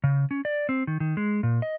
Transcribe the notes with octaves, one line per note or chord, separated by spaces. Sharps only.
C#3
C#4
D5
C4
D#3
D#3
G#3
A#2
D#5